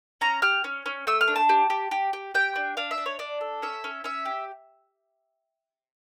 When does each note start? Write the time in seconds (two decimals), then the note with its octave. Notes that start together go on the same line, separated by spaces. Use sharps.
0.21 C#4 A#5
0.42 G4 F6
0.64 C#4
0.86 C#4
1.07 A3 E6
1.21 F6
1.28 D4
1.36 A5
1.49 G4
1.70 G4
1.91 G4
2.13 G4
2.34 G4 G5
2.56 D4
2.77 D4 F5
2.91 E5
2.98 D4
3.06 C#5
3.19 D4 D5
3.41 A4
3.62 C#4 E5
3.84 C#4
4.04 C#4 E5
4.25 G4